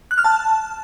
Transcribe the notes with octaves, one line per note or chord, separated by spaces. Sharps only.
F#6
F6
A5